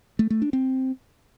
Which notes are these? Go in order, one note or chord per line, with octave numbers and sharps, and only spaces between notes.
A3
A3
D4
C4